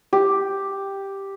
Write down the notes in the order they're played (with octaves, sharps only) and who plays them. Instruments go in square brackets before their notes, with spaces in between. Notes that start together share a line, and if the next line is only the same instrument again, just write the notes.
[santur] G4